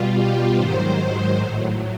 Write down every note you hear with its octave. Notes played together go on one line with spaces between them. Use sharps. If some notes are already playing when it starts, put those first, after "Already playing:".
Already playing: B2 G3 F4
G4
G#2 D#3 F#3 C5
C5
A2 F#3